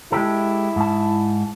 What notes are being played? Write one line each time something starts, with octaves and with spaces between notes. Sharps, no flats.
G#3 E4 G4 A4
G#2 A5